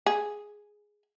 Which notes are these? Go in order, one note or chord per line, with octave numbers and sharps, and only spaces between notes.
G#4